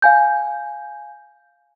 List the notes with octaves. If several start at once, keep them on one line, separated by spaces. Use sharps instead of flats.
F5 G#5 G6